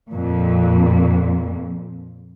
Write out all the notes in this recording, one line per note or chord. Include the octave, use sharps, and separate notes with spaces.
F2 A#2